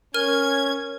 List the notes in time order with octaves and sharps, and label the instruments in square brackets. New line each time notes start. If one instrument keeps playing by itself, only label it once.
[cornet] C#4 [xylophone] A#4 F6 D#7 [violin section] G#6